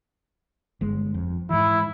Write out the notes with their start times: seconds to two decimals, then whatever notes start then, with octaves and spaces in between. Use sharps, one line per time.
0.81 G1 G#3
1.14 F2
1.50 G#2 E3 E4